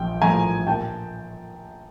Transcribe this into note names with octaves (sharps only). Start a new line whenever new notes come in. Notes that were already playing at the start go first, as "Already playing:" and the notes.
Already playing: A#1 F3 G5
A2 F3 G#5 A#5
A#2 G5 A5